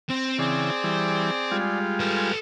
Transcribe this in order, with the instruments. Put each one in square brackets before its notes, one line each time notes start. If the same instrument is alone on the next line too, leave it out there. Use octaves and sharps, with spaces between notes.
[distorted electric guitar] C4
[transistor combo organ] C#3 E3 [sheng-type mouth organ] G#4 D5
[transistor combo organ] E3 G3
G3 G#3 F4
[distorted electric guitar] A4 B4 [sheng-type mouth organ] G#5 A5